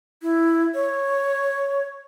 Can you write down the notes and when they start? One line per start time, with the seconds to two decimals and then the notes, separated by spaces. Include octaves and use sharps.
0.22 E4
0.74 C#5